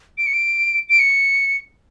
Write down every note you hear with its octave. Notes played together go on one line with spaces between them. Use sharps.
D7
C#7
D7
D7
C#7